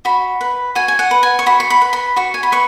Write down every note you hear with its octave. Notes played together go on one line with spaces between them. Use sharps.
F#4 B5
B4
F#4 G#5
G#5
F#5
B4
G#5
C#6
F#4 B5
C#6
B5
B4
B5
F#4 C#6
G#5
B5
B4 C#6